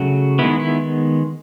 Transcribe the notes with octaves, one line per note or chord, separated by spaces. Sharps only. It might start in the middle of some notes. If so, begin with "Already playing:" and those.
Already playing: C#3 F#3 A3 F#4
D#3 G#3 B3 E4
E4